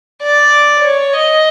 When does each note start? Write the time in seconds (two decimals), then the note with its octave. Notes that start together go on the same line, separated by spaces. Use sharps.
0.23 D5
0.84 C#5
1.14 D#5